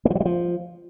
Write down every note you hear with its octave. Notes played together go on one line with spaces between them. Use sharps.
A#3
F3
F#3
G3
F3